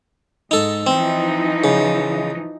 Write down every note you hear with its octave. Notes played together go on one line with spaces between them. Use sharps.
G#2 D#4 A4
E3 F3 C4 D#4
C#3